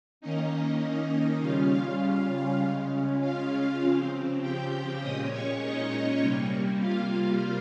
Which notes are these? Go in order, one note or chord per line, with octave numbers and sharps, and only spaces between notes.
D#3 A#3 C#4 D#4 D#5
C#3 G3 C#4 F4 F5
F4 F5
F4 F5
C#3 G#3 C#4
F4 F5
C#3 F3 C4
G4 G5
A#2 G#3 C#4 D#5 D#6
C#5 C#6
D#4 D#5
C3 G3 A#3
F4 F5